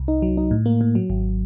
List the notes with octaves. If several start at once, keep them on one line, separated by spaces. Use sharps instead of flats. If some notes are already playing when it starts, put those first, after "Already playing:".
Already playing: C2
D#4
F#3
D#4
A2
A#3
A2
F#3
G#1